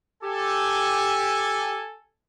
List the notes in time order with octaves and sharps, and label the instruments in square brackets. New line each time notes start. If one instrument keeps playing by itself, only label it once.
[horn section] G4 [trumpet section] A4 G#5